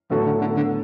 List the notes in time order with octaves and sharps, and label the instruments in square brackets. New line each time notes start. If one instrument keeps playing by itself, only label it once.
[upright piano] A2 F#3 B3 F#4 A4 [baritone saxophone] D3
[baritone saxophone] D3
D3
D3